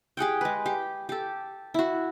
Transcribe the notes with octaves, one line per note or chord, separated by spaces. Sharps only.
G4 G#4 F#5 G5
G#3 B4
G4
G4 A4
E4 F#4